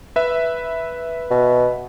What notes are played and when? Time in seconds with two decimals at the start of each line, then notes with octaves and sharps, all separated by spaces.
0.16 B4 E5
1.31 B2